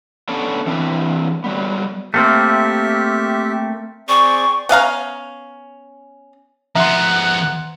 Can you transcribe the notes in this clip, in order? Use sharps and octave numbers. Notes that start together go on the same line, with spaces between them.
B3 C#4 D4 A4
E3 C4 D4 B4
F#3 G3 B3
A3 A#3 C4 G4 E5
C4 G#4 D5 C#6
B3 C#4 F5 A#5
F3 B3 E5 F#5 A#5 C6